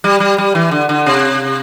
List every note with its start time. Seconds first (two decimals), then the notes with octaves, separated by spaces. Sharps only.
0.04 G3
0.20 G3
0.38 G3
0.55 E3
0.71 D3
0.89 D3
1.06 C3